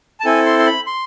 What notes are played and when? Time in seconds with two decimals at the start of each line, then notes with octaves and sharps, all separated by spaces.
0.20 A5
0.25 C4 E4 A4 G#5
0.46 C6
0.59 C6
0.66 B5
0.87 C6